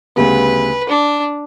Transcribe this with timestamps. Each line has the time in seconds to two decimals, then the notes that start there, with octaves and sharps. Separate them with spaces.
0.16 D2 C#3 G3 B3 B4
0.89 D4